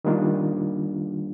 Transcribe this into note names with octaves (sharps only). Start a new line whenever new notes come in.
D#3 G3 A#3 D4 F4